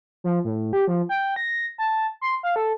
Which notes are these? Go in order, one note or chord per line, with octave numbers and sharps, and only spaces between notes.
F3
A2
G4
F3
G5
A#6
A5
C6
F5
A4